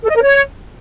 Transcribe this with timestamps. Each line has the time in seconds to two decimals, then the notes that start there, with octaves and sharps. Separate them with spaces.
0.03 A4
0.09 D#5
0.16 A#4
0.22 C#5